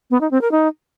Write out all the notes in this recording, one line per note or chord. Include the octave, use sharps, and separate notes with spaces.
B3
D#4
C4
A#4
D#4